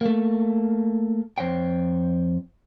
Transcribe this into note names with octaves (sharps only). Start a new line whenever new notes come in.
A3 A#3
F2 C5 C#5 G5